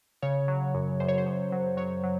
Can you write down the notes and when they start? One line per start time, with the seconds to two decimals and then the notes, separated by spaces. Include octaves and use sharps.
0.22 C#3 C#5
0.48 F#3
0.74 F#2
1.00 F#2 C5
1.09 C#5
1.18 C5
1.26 F#2
1.52 F#3
1.77 F#3 C#5
2.03 F#3